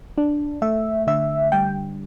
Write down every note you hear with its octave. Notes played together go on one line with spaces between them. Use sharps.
D4
A3 E5
D3 E5
G3 G5